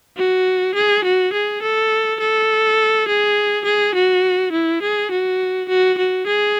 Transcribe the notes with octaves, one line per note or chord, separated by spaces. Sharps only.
F#4
G#4
F#4
G#4
A4
A4
G#4
G#4
F#4
E4
G#4
F#4
F#4
F#4
G#4